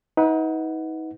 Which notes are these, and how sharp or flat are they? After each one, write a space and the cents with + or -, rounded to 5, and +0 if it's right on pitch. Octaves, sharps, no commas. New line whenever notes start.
D#4 +35 B4 +0 F#5 -10